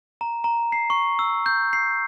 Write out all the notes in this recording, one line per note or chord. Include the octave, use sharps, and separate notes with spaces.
A#5
A#5
C7
C#6
E6
G6
C7